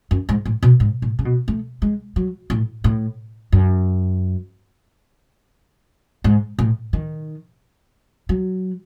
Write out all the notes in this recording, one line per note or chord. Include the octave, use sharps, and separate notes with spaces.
F#2
G#2
A2
B2
G#2
A2
C#3
B2
A3
G#3
F#3
A2
A2
F#2
G#2
A2
D#3
F#3